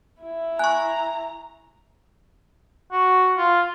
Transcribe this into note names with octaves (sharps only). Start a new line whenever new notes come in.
E4
G#5 A#5 C#6 F#6
F#4
F4